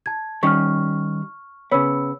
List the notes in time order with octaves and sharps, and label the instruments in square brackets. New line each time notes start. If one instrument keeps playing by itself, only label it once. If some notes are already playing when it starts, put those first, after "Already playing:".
[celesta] A5 G#6
[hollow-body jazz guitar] D#3 G3 C#4 [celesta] C#6 F6
[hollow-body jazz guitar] C#3 B3 [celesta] C#5 B5 E6